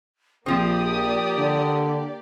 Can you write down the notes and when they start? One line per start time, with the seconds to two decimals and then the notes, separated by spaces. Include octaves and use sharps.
0.46 A#1 F3 A#3 C4 G4 D5 D#6
1.37 D3